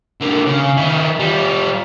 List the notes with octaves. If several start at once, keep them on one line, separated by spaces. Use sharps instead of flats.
D3 A#3
C#3
D#3 E4
G3 F4